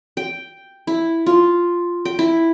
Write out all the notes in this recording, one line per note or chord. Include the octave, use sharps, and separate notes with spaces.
G5
E4
F4
G5
E4